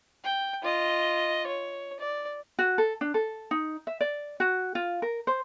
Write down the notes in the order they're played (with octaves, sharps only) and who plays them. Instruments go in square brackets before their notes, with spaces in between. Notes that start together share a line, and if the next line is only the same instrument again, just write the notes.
[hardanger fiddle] G5
F4 D#5
C#5
D5
[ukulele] F#4
A4
D4
A4
D#4
E5
D5
F#4
F4
A#4
C5